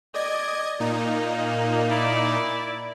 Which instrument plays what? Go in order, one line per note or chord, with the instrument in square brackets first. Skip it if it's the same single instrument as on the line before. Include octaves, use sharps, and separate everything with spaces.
[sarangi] D5 [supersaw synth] D#5 G#6
[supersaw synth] A#2 D#4 [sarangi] A#3
[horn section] E4 D5